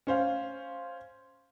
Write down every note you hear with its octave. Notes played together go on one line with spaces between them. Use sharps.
C#4 C5 F5